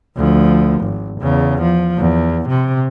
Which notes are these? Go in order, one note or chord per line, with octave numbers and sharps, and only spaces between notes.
D2 F3
G#1
E2 C#3
F3
E2
C3